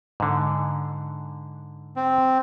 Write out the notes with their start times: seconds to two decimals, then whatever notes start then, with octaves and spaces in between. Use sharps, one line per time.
0.20 G#2 D3
1.96 C4